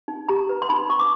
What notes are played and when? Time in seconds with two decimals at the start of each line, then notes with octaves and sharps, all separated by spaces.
0.08 D#4
0.28 G4 A#5
0.49 B4
0.62 C6
0.69 D#4 B5
0.90 D#4 C#6
1.00 D6